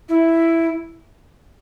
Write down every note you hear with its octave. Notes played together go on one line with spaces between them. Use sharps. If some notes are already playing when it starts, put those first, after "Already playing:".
E4